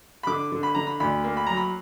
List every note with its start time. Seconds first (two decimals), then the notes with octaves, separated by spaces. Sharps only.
0.23 B5
0.27 D3 D6
0.52 D3
0.63 B5
0.75 D3 A#5
0.87 B5
1.00 D2 B5
1.24 A#3
1.37 B5
1.46 F#3 A#5
1.57 B5